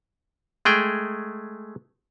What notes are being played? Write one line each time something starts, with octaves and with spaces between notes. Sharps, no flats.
G#3 A3 G#4 G5